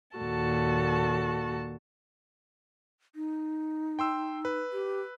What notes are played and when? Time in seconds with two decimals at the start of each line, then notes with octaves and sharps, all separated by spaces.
0.17 D#2 A#2 F#4 A4 A5
3.15 D#4
3.99 G5 C6 E6
4.45 B4
4.73 G4